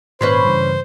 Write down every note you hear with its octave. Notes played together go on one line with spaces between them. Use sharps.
G#1 A#2 C#4 B4 C5 C6 G#6
G2 C#3 E3